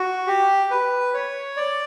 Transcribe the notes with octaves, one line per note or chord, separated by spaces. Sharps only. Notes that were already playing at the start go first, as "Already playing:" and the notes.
Already playing: F#4
G4
B4
C#5
D5